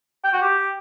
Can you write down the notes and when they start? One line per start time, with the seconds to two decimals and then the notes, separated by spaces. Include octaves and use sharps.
0.24 G5
0.33 F#4
0.42 G4